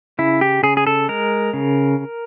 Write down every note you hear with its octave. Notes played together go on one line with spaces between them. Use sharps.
C#3 E4
G4
C#3 G#4
G#4
A4
G#3 A#4
C#3